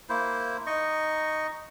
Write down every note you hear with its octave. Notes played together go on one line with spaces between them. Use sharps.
A#3 E4 C5
D#4 D#5 C#6